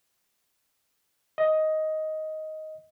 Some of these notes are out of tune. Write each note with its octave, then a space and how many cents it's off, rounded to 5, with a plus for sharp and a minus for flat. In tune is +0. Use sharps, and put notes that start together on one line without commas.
D#5 +10